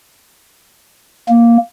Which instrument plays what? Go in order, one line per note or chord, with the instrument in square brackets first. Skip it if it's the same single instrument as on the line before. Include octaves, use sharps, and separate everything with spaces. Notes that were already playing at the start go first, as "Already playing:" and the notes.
[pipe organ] A#3